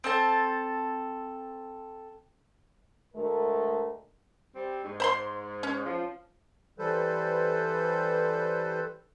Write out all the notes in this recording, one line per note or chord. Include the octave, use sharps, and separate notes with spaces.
C4 A4 A5
D2 G#3 A3 A#4
G3 C4
G#2
C5 B5 C6
C#4
F3
E3 G3 A4 B4 C5